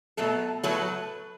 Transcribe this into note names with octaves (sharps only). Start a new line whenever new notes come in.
B2 F#3 A3 A4
A2 F#3 A3 B4